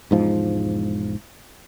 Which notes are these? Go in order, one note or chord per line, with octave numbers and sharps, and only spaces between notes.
E1 G#2 F3